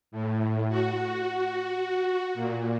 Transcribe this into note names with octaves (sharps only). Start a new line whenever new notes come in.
A2
F#4
A#2